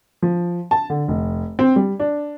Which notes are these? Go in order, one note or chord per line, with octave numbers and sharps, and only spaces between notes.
F3
A5
D3
F1
C4
G3
D4